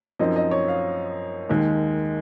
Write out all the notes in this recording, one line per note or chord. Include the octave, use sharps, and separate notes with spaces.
F#2 F3 C4 D#4 D#5
D#5
C#5
F5
D#2 D#3 G#3